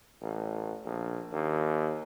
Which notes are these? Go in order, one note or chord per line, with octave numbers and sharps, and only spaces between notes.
A1
A#1
D#2